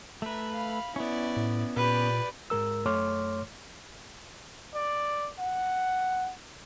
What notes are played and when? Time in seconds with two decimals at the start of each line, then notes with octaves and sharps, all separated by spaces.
0.22 A3 B4 E5 A#5
0.54 F5 B5
0.96 B3 C#4 E4 D5
1.36 A2
1.77 A#2 G4 B4 D5
2.50 G#2 G#3 A#4 E6
2.85 F#2 A3 C#5 C6 D6 F6
4.75 D5
5.39 F#5